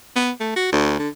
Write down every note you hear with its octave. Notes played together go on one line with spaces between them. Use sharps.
B3
A3
F#4
D2
D3